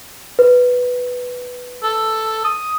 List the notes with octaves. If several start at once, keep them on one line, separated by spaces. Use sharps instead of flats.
B4
A4
D#6